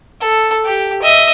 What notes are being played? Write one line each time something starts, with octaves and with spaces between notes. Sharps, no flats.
A4
G4
D#5 E5